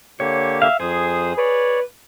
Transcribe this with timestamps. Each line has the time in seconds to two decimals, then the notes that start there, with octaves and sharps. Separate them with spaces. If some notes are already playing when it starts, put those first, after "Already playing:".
0.20 D3 A#3 G4 C#5
0.62 E5 F5
0.80 F2 G#4 C5 D#6
1.38 B4 C#5 D5